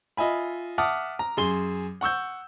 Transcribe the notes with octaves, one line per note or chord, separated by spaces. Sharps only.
F4 D#5 E5 G#5 B5
E5 F#5 A5 D6 D#6 F6
A#5
F#2 G#4 C6 G7
F#5 C#6 E6 G6